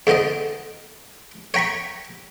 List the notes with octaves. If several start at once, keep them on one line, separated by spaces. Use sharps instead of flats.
E2 D3 C4 C5 D#5
C#5 G5 A#5 B5 C#6